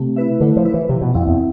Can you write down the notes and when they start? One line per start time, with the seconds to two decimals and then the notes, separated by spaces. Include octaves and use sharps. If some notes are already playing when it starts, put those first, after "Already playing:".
Already playing: C3 A3
0.16 E4 B4 E5
0.40 D3 A3
0.57 F3
0.65 E4 B4 E5
0.74 E3
0.89 C3 F3
1.01 B2
1.14 F2 C4 E4
1.27 E2